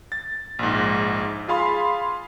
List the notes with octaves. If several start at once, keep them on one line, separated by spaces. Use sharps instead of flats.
A6
A#1 G#2
F4 G#4 F5 B5 C6